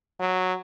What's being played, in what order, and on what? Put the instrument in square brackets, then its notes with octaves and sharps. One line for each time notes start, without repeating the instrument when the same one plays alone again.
[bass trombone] F#3